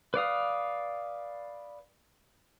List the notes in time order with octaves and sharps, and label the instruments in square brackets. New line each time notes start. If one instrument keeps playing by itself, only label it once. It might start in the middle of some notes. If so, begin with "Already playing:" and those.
[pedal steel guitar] B4 D5 F5 D#6